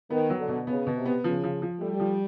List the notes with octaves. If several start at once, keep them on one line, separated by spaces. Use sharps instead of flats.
D#3 B3
F#3
D3
B2
C#3 B3
B2
C3
B3
C#3 F3
F3
F3
G3 A3
F3